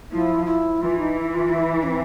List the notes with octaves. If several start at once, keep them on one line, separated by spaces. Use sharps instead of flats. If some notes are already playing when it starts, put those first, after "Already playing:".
F3 E4
E4
E3 F4
D#4
E4
F4
E4
C#4
C4